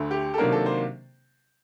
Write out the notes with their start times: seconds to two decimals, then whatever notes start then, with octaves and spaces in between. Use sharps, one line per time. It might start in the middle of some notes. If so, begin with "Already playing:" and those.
Already playing: D2 D3 A3
0.11 G4
0.34 A4
0.38 C3 D#3 F#3 A#3 D4 A#4
0.52 A4
0.66 C5